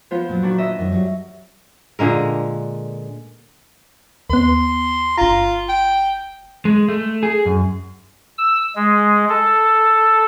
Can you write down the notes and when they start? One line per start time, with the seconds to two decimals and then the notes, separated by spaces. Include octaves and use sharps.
0.11 F3 B3 F4
0.29 A#2 F#3
0.43 D#3 D4 F#4
0.58 D#5 E5
0.79 F#2 D#3
0.92 F#3 G3 F#4
1.99 A#2 D3 G#3 A#4
4.30 D#2 B3 C6
5.17 G1 F4 A#5
5.69 G5
6.65 G#3
6.88 A3
7.23 G#4
7.45 F#2
8.38 E6
8.76 G#3
9.29 A4